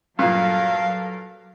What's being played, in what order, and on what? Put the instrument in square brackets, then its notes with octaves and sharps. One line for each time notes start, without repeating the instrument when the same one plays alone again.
[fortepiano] G2 A#2 [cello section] F#3 A4 A#4 [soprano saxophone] F5